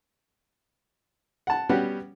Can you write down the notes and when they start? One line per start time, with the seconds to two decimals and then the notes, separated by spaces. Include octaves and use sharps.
1.47 F#5 A5
1.69 G3 B3 C#4 F#4 G4